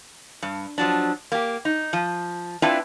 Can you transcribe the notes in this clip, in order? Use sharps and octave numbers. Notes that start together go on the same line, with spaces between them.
G2
F3 F#3 D4
A#3 G4
D#4
F3
C4 D4 E4 F4 B4 E5